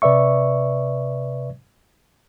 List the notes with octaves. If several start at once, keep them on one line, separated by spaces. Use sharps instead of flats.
C3 B4 D5 E5 C#6